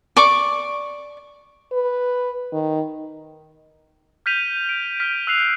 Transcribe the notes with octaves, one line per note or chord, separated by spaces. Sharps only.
D5 C#6 D6
B4
D#3
F6 G6 B6 D#7 F7
D7
F6 B6
E6 F#6 C7 F7